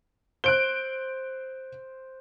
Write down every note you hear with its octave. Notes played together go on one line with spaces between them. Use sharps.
C5 F#6 D7 G7